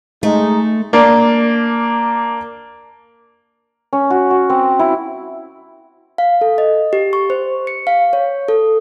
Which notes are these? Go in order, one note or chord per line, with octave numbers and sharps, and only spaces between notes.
G#3 A3 D#4
A#3 D4
C#4
F#4
F#4
C4
E4
F5
A4
D#5
G4
C#6
C5
C#7
F5
C#5
A4